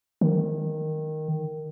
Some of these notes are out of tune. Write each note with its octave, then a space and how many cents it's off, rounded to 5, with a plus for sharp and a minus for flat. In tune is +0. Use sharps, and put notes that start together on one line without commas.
D#3 -5